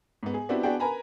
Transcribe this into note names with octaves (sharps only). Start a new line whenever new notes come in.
G#2 B3
G#4
B3 C4 D4 E4 F#4 G4
B3 D4 F#4 G#4 G5
A#4 B4 G#5 A#5 B5